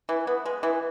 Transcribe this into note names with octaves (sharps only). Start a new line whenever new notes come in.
E3
B3
G#3
E3